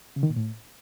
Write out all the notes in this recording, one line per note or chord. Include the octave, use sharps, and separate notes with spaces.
C#3
D#3
A#2
A2